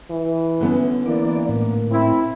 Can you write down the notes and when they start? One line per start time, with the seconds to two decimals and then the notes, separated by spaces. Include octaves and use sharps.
0.10 E3
0.60 D3 B3 C#4
1.05 E3 A#3 D5
1.49 A2
1.90 C4 E4